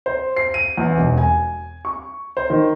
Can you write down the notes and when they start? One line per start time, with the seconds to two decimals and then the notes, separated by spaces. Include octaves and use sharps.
0.06 C5
0.37 C7
0.54 D#7
0.78 E2
0.97 E1
1.18 G#5
1.85 C#6
2.37 C5
2.50 D#3